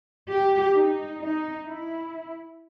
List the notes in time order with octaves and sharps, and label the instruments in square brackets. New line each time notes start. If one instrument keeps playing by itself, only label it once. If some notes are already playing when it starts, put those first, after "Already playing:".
[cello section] G4
D#4
D#4
E4